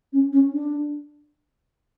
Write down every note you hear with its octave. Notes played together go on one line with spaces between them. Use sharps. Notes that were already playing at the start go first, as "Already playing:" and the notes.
C#4
C#4
D4